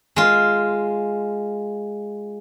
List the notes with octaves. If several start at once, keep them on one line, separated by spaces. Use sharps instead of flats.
G#3 F4